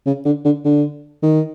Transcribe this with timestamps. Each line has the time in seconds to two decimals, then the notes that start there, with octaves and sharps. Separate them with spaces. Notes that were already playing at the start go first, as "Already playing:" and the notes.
0.06 C#3
0.25 D3
0.45 D3
0.65 D3
1.23 D#3